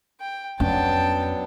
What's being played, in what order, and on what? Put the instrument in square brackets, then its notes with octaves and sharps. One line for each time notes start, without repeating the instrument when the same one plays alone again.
[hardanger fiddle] G5
[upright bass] F2 C#4 [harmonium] F#3 B3 D4 [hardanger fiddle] G5 A5